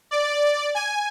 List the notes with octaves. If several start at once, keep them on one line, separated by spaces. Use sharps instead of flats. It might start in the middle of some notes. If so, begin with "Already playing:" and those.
D5
G#5